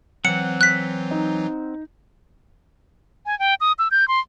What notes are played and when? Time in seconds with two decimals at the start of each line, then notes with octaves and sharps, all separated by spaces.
0.25 E3 F#3 C4 F#5 C#7
0.61 F#6 B6
1.11 D#4
3.26 G#5
3.39 G5
3.61 D#6
3.79 E6
3.91 G6
4.08 C6